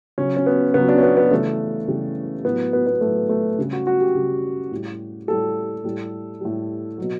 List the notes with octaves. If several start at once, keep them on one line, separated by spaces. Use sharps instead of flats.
C#3 F#3 C#4
C#4
B3
C#3 F#3 B3
D4
C#4
B3
B3
C#3 E3 G3 A3
C#3 E3 G3
A2 F#3 B3
B3
B3
A2 F#3 A3
A3
C#3 G3
F#4
F#4
G4
C#3 G3
A2 G3
A2 G3 A4
A2 G3
A2 G3
B2 F#3